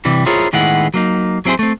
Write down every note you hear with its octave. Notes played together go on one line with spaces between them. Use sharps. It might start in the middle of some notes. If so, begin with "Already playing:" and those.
C3 E3 G3
E4 F4 G#4 A#4 C5 C#5
A2 D#3 G#3 B3 E4 F#5
F#3 A#3 D#4
F#3 C4 E4 G#4 C5
A3 C4